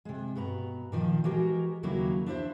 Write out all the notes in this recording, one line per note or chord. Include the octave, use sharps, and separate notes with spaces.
C3 G#3
G2 B2 B4 A#5
A#2 D#3 F3
E3 G#3 F#4 G4 A#4
D#2 C#3 F#3 A#3 D#4 E4
D4 E4 C5 E5